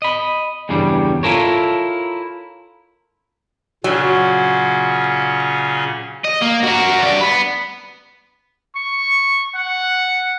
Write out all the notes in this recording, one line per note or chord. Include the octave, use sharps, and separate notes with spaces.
D#5 B5
E2 G2 C#3 G3
E4 F4 A4 A#4 C#5
A#2 C#3 F#3 C#4
D#5
A#3
F#4 A#4
G2 D5
B3 B5
C#6
F#5